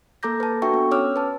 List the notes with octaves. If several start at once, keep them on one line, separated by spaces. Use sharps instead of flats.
A#3 A4 A#5 D6 G6 A#6
B4 A5
D4 F#4 A4 E5 G5 C#6
B3
C#4 C#5 D6 E6 F6
B4 A5